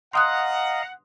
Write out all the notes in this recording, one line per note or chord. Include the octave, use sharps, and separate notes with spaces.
D#5 F5 F#5 A#5 C6 D#6 F#6